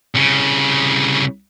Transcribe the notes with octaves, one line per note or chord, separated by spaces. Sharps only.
C2 C#3